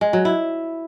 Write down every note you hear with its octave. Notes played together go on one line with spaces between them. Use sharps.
G#3
F#3
E4